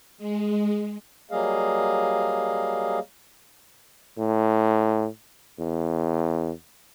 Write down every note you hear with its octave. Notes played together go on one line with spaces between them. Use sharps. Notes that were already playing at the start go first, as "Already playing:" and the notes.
G#3
F#3 G3 A#3 G#4 D#5 F5
A2
E2